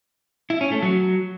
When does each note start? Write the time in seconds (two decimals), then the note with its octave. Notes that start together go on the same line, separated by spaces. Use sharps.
0.50 E4
0.61 C#4
0.72 A3
0.82 F#3